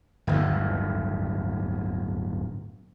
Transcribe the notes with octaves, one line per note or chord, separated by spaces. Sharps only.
D1 G1 D#2